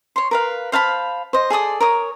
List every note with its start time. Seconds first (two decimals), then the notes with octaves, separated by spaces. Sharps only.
0.16 C#5 C6
0.31 A#4 B4 F5
0.72 C5 F5 A5 B5
1.33 C5 D#5
1.50 G#4 A4 D5 D#6
1.81 A#4 C#5 D#6